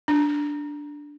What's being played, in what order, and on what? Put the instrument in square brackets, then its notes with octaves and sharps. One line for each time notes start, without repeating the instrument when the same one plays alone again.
[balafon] D4